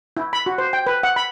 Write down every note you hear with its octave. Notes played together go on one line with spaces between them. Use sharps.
E4
B5
F#4
C5
G5
B4
F#5
B5